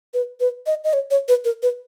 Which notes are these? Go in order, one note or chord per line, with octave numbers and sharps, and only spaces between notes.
B4
B4
D#5
D#5
C#5
C#5
B4
A#4
B4